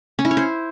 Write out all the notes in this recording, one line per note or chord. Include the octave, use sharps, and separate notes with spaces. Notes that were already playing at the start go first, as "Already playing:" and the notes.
C#4
E4
C#5
C5